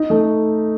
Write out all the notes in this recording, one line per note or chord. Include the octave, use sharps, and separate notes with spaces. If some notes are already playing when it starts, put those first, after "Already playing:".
Already playing: D#4
A3